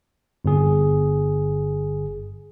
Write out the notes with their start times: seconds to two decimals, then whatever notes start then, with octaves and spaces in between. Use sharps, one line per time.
0.45 G1 G#4